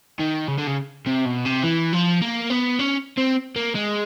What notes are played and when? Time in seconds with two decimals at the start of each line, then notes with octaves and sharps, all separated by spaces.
0.20 D#3
0.48 C#3
0.58 D3
0.67 C#3
1.06 C3
1.25 B2
1.45 C3
1.63 E3
1.93 F3
2.22 A#3
2.50 B3
2.79 C#4
3.18 C4
3.56 A#3
3.75 G#3